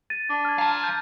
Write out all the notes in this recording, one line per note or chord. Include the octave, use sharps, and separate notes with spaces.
A6 D#7
D4
F6 G#6
F5 A5 A#5
G6